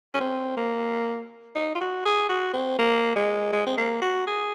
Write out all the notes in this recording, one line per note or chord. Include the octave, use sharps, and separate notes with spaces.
C#4
C4
A#3
D#4
F4
F#4
G#4
F#4
C4
A#3
G#3
G#3
C4
A#3
F#4
G#4